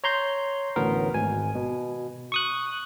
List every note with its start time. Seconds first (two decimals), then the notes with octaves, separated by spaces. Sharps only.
0.04 C#5 A#5 C6 G6
0.76 A1 D2 A2 B3 A#4
1.14 G#1 G#5
1.55 B2
2.32 C#6 D#6 F#6